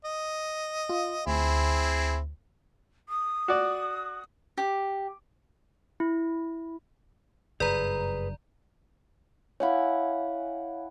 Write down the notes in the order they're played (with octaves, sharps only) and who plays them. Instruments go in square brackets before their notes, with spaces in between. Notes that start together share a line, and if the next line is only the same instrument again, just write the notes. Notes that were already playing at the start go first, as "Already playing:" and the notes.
[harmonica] D#5
[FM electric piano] F4
[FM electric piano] D2 [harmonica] C4 E4 G#4
[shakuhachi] D#6
[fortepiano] F#4 D5
[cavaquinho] G4
[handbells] E4
[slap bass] F#1 G2 [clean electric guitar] G#4 B4 [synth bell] D5 A#5
[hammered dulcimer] E4 F#5 G#5 [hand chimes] C#5 F5